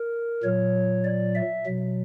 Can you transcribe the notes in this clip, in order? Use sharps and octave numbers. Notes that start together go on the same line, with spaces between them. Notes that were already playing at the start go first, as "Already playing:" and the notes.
Already playing: A#4
A#2 F#3 C#5
D5
E5
B2 F#3